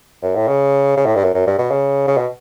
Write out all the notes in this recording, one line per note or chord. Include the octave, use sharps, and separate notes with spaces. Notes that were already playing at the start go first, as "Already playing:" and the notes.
F#2
A2
C#3
C#3
A2
G2
F#2
F#2
G2
B2
C#3
C#3
B2